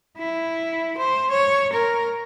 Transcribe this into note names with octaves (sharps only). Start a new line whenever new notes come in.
E4
C5
C#5
A#4